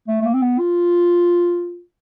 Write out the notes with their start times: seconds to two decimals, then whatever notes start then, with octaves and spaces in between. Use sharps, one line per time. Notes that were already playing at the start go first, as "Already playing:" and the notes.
0.08 A3
0.21 A3
0.25 A#3
0.34 C4
0.42 B3
0.59 F4